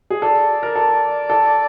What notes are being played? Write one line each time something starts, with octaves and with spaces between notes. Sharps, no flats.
G#4
A4 D5
A#4
A4
A4